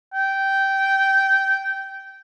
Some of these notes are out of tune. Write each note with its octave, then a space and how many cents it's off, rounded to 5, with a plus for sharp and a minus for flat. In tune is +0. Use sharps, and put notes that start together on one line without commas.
G5 -15